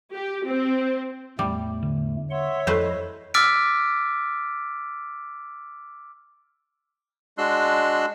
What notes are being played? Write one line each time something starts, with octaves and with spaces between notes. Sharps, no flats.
G4
C4
E2 A2 G3 A3
D3
C#5 E5 F#5 C6
F2 A3 E4 B4 C5 D#5
D6 E6 F6 A6 B6 D7
G#3 D4 F#4 C6 E6 F#6